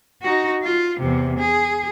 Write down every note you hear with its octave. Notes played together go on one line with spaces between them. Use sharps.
D#4 F#4
F4
E2 C3
G#4